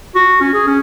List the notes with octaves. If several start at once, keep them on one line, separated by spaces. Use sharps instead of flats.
F#4
C#4
G#4
C#4